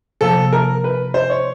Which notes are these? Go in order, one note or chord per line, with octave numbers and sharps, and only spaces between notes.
C3 F3 A#3 A4
A#4
B4
C5
C#5